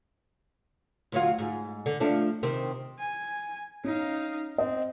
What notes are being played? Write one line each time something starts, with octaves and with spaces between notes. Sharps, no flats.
D2 F#3 F4
G#2
D3
F3 A3 D4
C3 D#3 C4
G#5
C#4 D#4 F5
C4 D#5